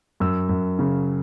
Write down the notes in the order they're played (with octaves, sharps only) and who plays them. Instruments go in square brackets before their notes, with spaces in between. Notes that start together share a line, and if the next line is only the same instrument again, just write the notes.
[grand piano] F#2 E6
F#2
C#3